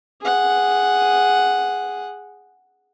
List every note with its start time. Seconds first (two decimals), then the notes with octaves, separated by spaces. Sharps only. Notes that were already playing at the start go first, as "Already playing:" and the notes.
0.22 G#4 F#5